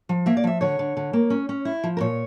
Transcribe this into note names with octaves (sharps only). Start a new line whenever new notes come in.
F3
A#3 E5
D5
F3 E5
D3 C#5
D3
D3
A#3
C#4
C#4
E4
F3
A#4
A#2 C#5